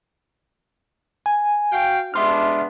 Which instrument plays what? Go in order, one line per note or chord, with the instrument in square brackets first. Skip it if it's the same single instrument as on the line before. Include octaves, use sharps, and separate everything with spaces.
[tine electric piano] G#5
[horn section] F#4 F5 G5
[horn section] G#3 B3 D4 [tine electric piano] E5 C6 F6